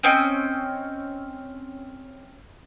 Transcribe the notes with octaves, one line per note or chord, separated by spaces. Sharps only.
C4 C#4 D#5 G5